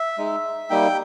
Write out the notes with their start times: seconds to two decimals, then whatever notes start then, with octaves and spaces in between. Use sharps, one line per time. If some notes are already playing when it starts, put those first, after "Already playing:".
Already playing: E5
0.18 G#3 D#4
0.70 G3 A#3 D#4 G5